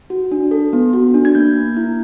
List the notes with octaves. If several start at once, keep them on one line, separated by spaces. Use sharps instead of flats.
F#4
D4
A4
B3
F#4
D4
G#6
A#3 G6
A#3
E4